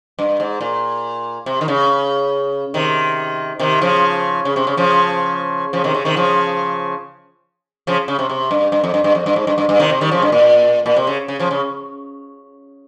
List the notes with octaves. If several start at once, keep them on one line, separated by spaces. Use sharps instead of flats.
G2
G#2
A#2
C3
D#3
C#3
C3 D#3
C3 D#3
C#3 F3
C#3
C3
C#3
C#3 F3
C#3 F3
C3 D#3
C#3
C3 D#3
C#3 F3
C#3 F3
C#3
C3
C3
G2
G2
F2
G2
G2
F2
G2
G#2
G2
G2
G2
C3 D#3
C3
D#3 G3
C#3 F3
G2
A#2
A#2
C3
C#3
C#3
C#3 F3
C#3